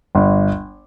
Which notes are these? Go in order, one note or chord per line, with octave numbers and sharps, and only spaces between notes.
G1